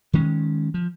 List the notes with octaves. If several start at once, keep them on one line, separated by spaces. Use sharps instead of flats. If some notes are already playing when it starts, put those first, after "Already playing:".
D#3 G#3 C#4
F3